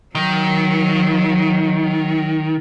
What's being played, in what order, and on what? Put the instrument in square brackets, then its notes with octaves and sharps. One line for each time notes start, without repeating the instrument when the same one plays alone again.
[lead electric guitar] D#3 [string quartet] F#3